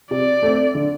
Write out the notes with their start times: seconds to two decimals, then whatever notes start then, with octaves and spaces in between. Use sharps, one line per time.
0.11 C3 D5
0.42 A3 C4
0.75 D3